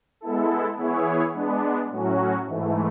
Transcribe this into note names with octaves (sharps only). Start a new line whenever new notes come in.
G#3 B3 E4 A4
E3 B3 E4 G#4 C#5
G#3 B3 D4
A2 F#3 C#4 F#4
G#2 E3 A3